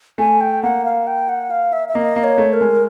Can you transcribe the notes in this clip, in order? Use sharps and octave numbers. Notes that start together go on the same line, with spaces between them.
A3 G#5
G5
A#3 F#5
F5
G5
F#5
F5
E5
E5
A#3 D#5
A#3
C#5
A3
A#4
G#3